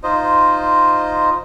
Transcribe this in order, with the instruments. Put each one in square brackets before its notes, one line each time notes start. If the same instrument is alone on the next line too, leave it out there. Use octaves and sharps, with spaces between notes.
[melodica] D#4 F4 C5 D#5